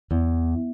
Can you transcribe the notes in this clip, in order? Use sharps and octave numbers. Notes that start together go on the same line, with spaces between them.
E2